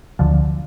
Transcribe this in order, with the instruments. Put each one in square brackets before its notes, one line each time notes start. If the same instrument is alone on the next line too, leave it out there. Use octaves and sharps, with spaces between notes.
[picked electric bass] D2 D3 F3